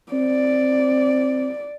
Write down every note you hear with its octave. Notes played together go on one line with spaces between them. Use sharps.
C4 D5